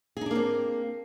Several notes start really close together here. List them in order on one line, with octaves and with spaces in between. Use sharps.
G#4 D#4 D4 A#3 C4